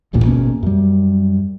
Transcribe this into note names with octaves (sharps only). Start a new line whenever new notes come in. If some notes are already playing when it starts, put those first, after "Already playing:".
D#1 A1 D2 A#2
G#1 B2 A#3 C#4
F#2 G3